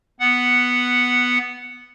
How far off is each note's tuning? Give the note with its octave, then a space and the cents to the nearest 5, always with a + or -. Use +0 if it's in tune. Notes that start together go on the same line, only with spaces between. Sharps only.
B3 +0 F#5 +0